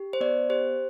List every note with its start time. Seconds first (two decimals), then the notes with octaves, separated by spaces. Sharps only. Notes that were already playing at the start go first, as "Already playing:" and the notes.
Already playing: G4
0.13 C5
0.21 B3 D5
0.49 G4 C5